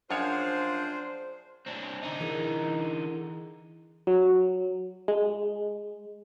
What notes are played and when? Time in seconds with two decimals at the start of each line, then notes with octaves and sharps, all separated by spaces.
0.11 F#2 F3 D4 F4 G#4 C5 C#5
1.67 C4 D4
2.03 D3 D#4
2.20 E3 E4 G#4 A#4
4.07 F#3
5.08 G#3